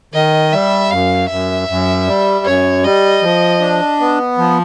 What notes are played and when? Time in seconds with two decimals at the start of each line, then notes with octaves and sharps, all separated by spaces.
0.14 D#3 D#5
0.53 G3 E5
0.91 F#2 F5
1.29 F#2 E5
1.68 F#2
2.07 G3
2.45 F#2 C#5
2.84 G3 D#5
3.22 F3
3.61 D4
4.00 B3
4.38 F3